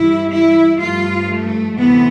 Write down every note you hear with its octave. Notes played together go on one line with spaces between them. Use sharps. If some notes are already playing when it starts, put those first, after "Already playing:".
Already playing: G2 E3 G3 E4
E4
G2 F3 A3 F4
A3
D2 C3 E3 A3 B3